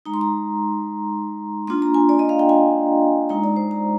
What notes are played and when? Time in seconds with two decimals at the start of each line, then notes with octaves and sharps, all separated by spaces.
0.06 G#3 D#4 A#5
0.14 C6
0.21 A#5
1.67 A#3 D4 F4 C6
1.82 A#5
1.94 G#5
2.09 D5
2.19 D#5
2.29 F5
2.39 G5
2.49 G#5
3.29 G#3 D#4 A#5
3.44 D5
3.56 C5
3.71 A#5